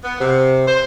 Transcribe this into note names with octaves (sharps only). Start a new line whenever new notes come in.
B3
C3
C5